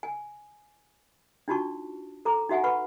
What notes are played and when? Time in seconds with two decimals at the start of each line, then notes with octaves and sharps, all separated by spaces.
0.03 G#5
1.48 D4 D#4 F4 F#4 A5 C#6
2.25 A4 A#5 D6
2.49 D#4 F#4 E5 F#5 G#5
2.64 B4 F#5 B5 C#6